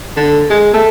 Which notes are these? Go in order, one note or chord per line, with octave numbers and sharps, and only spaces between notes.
D3
G#3
A3